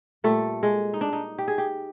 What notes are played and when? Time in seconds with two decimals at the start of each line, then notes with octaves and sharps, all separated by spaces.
0.24 A#2 G3 A3
0.63 G#3
0.94 D#4
1.01 D4
1.13 D#4
1.38 G4
1.48 G#4
1.58 G4